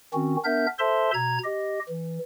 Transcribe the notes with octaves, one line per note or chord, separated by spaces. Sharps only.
D#3 C4 C#4 F#4
B3 D4 A#4 E5 G6
A4 C5 E5 A5 C6
B2 A#5 G#6
G4 D#5
E3